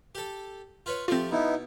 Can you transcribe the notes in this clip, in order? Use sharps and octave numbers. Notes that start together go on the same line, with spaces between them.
G4 A4
F4 B4 C#5
F3 A3 C4 F4 G4
B2 B3 D#4 E4